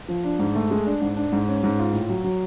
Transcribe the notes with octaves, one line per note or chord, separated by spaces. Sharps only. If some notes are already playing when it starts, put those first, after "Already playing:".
F3
D4
G#2
A3
G#3
D4
G#2
D4
G#2
C#4
G#2
F4
A2
F#3
F#3